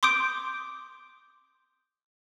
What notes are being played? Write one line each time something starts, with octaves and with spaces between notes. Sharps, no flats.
C6 D6 D#6 G6 D7